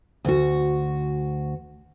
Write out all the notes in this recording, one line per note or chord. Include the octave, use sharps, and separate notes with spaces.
D2 F#4